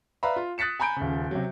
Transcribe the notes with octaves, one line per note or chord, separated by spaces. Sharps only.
B4 D5 E5 F5 A#5 B5
F4
D#6 F#6 A6 B6 C#7 E7
G#5 A#5 B5 G6 D7
D#1 C#3
C3 F#3